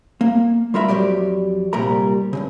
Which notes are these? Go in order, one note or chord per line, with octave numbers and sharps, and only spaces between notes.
A#3
G3 F4 A#4 E5 B5
F2 F#3 G4 D5
C2 A#2 G3 A#4 A#5
G2 A#2 C#3